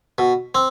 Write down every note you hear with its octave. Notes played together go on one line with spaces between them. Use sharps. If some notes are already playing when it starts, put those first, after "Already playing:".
B2
C4